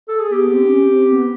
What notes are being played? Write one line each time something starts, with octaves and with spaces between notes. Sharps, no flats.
A4
G#4
B3 G4
C4
D4
C#4
C4
B3